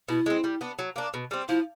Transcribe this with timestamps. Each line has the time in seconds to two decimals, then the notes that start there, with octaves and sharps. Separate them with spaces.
0.08 B2 E4
0.26 G#3 C4
0.44 G3
0.61 B3 D4
0.79 F#3
0.96 A#3 D4
1.14 B2
1.31 G3 C4
1.48 F3 E4